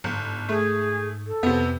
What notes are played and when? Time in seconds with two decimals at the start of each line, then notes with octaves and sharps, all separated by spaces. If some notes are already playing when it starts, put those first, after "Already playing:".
0.04 G1 G#2
0.49 A3 G#4
1.27 A4
1.43 F2 C3 B3